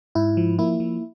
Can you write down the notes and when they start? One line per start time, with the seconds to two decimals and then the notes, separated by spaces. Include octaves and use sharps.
0.15 G#2 E4
0.37 F3
0.59 A#3 E4
0.80 F3